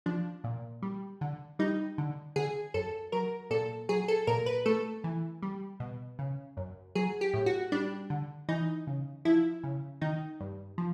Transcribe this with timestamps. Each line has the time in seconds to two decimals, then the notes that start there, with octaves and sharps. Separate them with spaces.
0.06 F3 D4
0.44 A#2
0.82 G3
1.21 D3
1.59 G3 D#4
1.98 D3
2.36 D3 G#4
2.74 F#2 A4
3.12 F#3 A#4
3.51 A#2 A4
3.89 F#3 G#4
4.08 A4
4.27 A#2 A#4
4.46 B4
4.66 A3 A4
5.04 E3
5.43 G3
5.80 B2
6.19 C#3
6.57 F#2
6.95 F#3 G#4
7.21 G4
7.34 A2
7.46 F#4
7.72 G3 D4
8.10 D3
8.49 E3 D#4
8.87 C#3
9.25 F3 E4
9.64 C#3
10.01 D#3 D#4
10.41 G2
10.78 F3